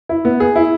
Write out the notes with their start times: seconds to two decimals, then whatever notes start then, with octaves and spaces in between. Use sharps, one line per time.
0.09 E4
0.25 B3
0.40 G#4
0.56 E4